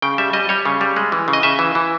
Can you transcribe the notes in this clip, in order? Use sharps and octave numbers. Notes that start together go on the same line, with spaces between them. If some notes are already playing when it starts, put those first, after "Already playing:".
C#3 G5
G3 E5
G3 D#5
G3 C#5
C#3
G3
G#3
E3
C#3
D#5
C#3 E5
E3
E3